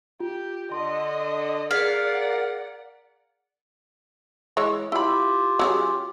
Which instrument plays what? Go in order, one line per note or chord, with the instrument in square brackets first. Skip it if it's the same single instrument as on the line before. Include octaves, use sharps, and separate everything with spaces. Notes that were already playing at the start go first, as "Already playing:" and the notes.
[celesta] F4 [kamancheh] G4
[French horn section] D3 [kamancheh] D#5 [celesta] C6
[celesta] G#4 G#6 B6 [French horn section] A#4 [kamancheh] D5 F#5 [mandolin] F5
[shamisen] E3 G#3 C#5
[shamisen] E4 B5 [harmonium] F4 G4
[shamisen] F#3 C#4 G#4